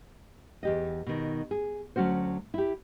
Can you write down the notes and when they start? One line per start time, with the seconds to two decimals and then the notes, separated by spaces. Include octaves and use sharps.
0.63 E2 G4 D#5
1.07 B2 D#3
1.51 G#4
1.96 D2 F#3 C#4 F#4 C5
2.54 E4 G4